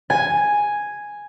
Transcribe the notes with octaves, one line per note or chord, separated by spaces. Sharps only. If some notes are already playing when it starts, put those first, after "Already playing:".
G#5